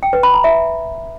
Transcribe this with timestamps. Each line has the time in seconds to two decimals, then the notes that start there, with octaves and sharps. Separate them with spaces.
0.03 G5
0.13 B4
0.23 B5
0.34 A#5
0.44 E5